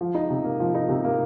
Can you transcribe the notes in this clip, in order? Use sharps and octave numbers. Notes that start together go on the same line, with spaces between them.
F3
D#4
C3
A#3
F3
D#4
C3
A#3